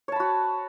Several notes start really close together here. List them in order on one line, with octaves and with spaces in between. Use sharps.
C#5 A5 B5 F#4